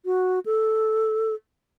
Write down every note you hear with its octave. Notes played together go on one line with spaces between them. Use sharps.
F#4
A4